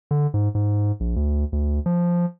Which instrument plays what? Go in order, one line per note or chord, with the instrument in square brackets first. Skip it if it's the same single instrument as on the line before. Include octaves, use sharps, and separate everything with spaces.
[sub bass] D3
G#2
G#2
A#1
D2
D2
F3